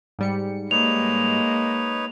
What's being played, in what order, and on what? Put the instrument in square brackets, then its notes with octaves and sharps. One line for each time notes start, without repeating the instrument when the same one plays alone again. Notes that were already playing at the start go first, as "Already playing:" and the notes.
[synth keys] G#2 G3 C#7
[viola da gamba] G#3 A#3 [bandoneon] D#4 B4 C#5 [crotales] F7